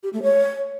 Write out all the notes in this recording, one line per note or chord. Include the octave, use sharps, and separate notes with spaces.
G4
A3
C#5